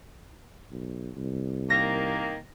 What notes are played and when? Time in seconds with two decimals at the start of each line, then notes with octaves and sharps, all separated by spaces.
0.71 B1
1.17 C2
1.70 D#3 A#3 A#6